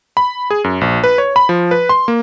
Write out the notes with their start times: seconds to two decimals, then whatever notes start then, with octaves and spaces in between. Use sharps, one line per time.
0.17 B5
0.50 G#4
0.64 F#2
0.81 A#1
1.04 B4
1.18 C#5
1.36 B5
1.49 F3
1.71 B4
1.89 C6
2.08 A#3